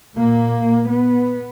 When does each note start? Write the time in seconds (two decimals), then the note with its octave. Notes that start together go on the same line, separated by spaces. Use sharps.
0.16 A#2 A#3
0.90 B3